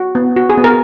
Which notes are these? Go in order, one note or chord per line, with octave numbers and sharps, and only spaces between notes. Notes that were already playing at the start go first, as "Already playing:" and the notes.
Already playing: F#4
B3
F#4
G#4
B3
A#4